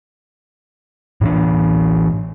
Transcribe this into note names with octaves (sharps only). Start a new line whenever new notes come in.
A2 E3 D4